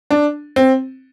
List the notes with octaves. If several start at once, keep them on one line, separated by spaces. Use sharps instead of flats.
D4
C4